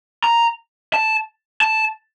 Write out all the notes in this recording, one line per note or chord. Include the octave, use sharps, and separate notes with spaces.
A#5
A5
A5